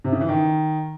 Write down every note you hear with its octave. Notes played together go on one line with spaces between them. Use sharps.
C3
C#3
E3
D#3